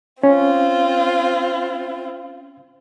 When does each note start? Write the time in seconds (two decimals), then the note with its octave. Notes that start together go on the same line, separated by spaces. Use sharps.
0.23 C4 C#4 F4